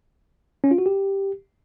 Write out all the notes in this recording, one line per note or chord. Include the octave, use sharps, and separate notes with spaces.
C#4
F4
F#4
G4